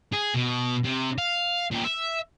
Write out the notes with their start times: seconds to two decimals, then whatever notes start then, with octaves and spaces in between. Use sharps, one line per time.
0.13 G#4
0.34 B2
0.84 C3
1.18 F5
1.71 A#2 G4
1.85 E5